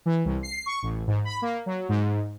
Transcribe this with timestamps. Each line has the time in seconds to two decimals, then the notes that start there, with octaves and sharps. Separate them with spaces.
0.06 E3
0.25 C2
0.43 C7
0.66 C#6
0.83 A1
1.07 G#2
1.25 B5
1.42 A#3
1.66 F#3
1.89 G#2